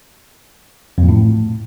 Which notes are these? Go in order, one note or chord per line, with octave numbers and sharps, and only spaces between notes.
F2
A#2
A2